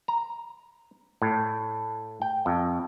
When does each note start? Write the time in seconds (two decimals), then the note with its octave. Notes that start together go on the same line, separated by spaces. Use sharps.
0.08 A#5
1.22 A2
2.22 G5
2.46 F2